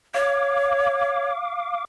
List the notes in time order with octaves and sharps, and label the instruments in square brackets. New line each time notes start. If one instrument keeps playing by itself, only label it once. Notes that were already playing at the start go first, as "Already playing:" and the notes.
[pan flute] C#5 [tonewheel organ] F5 D6